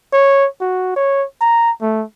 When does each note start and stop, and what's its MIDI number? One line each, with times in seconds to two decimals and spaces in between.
0.13 0.47 73
0.61 0.92 66
0.96 1.25 73
1.41 1.71 82
1.82 2.04 57